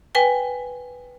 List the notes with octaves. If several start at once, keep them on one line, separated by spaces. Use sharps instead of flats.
B4 G5 G#5